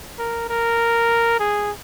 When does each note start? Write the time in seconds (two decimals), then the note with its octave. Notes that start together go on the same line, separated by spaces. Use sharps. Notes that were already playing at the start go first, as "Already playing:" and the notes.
0.19 A#4
0.49 A#4
1.40 G#4